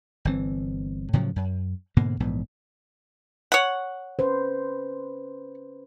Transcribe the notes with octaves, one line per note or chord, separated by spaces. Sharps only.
G1 E3 C4
A2 C#3 F3 F#3
F#2
G#2 B2 D3 A#3
A#1 G#2 E3 B3
C#5 F#5
C#4 B4 C5